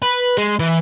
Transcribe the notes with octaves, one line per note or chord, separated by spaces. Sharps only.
B4
G#3
E3